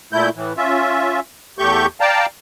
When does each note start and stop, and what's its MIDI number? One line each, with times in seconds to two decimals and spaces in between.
0.13 0.29 46
0.13 0.29 57
0.13 0.29 64
0.13 0.29 91
0.35 0.53 45
0.35 0.53 52
0.57 1.20 61
0.57 1.20 65
0.57 1.20 76
1.59 1.86 40
1.59 1.86 57
1.59 1.86 67
1.59 1.86 85
1.59 1.86 91
2.01 2.26 74
2.01 2.26 77
2.01 2.26 79
2.01 2.26 81
2.01 2.26 82